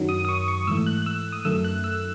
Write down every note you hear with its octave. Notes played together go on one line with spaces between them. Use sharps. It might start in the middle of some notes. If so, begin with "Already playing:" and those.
Already playing: F#2 D#3 F#3
D#6
D#6
C#6
C#6
G#2 E3 A3 E6
F#6
F#6
E6
D#6
F#2 D#3 A3 E6
F#6
E6